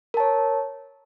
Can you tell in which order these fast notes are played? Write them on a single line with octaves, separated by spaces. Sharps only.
A#4 A5 C#5